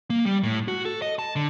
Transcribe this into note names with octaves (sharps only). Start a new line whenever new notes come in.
A#3
G3
A2
F#4
A4
D#5
A5
D3